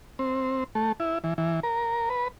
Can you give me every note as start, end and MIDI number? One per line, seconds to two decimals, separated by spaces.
0.19 0.64 60
0.75 0.92 57
1.00 1.18 64
1.24 1.34 52
1.38 1.60 52
1.63 2.09 70
2.10 2.28 71